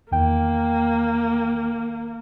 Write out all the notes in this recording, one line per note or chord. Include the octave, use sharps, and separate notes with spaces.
E2 D#3 A#3 G5